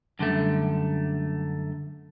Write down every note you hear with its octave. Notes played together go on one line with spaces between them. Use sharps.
F#2 D3 G3 A3